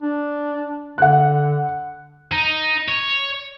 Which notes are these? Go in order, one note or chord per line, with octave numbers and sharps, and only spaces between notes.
D4
D3 F#5 F#6
D#4
C#5